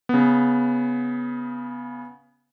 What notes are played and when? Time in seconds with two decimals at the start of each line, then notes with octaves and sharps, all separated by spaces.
0.09 C#3 B3